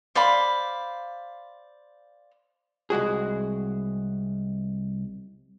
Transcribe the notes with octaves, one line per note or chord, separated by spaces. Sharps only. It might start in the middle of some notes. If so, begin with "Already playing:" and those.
C5 D5 F5 B5
C2 G#3 F#4 G#4